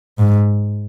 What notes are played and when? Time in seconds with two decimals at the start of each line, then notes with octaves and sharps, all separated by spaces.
0.18 G#2